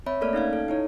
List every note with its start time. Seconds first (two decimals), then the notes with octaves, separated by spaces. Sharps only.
0.06 C4 C#5 E5 B5
0.21 A3 A#3 A4 A#4 D5 F6
0.33 C#4 D#4 F5 G#6
0.53 A4
0.68 D#4 E4 C#5